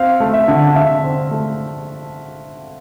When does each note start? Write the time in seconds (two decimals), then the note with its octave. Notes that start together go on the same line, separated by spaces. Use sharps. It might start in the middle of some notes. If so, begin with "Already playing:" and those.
Already playing: C4 F5
0.20 A3
0.34 E5
0.48 D3
0.76 D3 E5
1.04 C4
1.31 A3